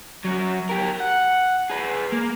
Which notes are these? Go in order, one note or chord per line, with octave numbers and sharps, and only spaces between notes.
F#3 C#4
G4 A#4
F#5
G#4 B4
A#3